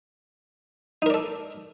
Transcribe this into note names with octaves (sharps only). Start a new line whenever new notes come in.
D#4 A4 A#4 D5